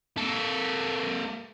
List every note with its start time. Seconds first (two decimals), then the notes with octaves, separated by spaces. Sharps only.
0.17 A#3 A4